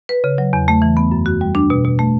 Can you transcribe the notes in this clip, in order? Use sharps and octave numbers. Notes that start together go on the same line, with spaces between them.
B4
C#3
F#3
E2
A3
E3
B3
F#2
F#4
G3
D4
B2
B2
A3